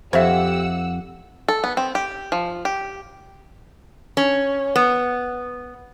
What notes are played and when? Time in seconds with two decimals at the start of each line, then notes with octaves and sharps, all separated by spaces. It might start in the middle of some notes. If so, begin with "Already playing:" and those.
0.13 F2 G4 C5 E5 F#5 E6
1.48 A4
1.64 B3
1.77 C4
1.95 G4
2.32 F3
2.65 G4
4.17 C#4
4.76 B3